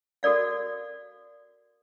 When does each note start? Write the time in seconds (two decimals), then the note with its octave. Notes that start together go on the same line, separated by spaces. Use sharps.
0.23 F#4 A4 A#4 D5 F5